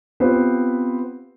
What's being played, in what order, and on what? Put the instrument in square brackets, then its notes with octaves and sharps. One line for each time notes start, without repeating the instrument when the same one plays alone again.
[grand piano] B3 C4 F4 G4 B4 C5